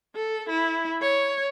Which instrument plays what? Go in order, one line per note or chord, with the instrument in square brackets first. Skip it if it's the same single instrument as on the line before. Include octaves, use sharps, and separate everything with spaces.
[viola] A4
E4
C#5